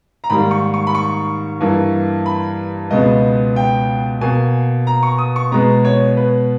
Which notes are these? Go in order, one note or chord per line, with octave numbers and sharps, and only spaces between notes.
A#5
G#2 D#3 G3 A#3 B5
C#6
C#6
B5
C#6
G2 E3 A#3
B5
C#2 B2 G#3 B3 D#5
G5
B2 A#3 G#5
A#5
C#6
D#6
C#6
B2 G#3 B3 A#5
C#5
B4